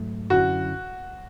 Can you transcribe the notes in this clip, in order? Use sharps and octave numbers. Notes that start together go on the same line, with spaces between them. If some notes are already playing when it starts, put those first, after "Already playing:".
Already playing: G#2 F#3 A3
F#2 D3 F#3 C#4 E4 F#4